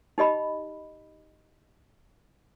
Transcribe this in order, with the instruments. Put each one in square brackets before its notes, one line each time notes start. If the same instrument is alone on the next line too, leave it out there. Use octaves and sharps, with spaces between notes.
[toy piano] D#4 G4 D#5 B5